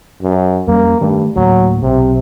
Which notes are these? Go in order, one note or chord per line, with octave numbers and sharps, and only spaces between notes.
F#2
F2 G3 A#3 C#4
G2 D#3 A3
D2 A2 F#3 A#3
B1 C3